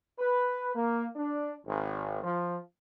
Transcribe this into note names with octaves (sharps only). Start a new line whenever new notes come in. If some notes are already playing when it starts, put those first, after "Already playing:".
B4
A#3
D4
G#1
F3